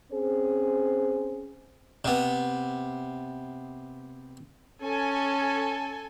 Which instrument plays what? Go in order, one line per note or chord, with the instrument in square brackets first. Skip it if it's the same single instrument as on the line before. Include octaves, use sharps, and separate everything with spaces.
[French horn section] C4 C#4 G#4 C5
[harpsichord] C3 B3
[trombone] C#4 [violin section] A4 G#5